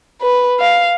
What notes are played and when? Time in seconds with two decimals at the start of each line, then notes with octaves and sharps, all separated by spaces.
0.22 B4
0.60 F5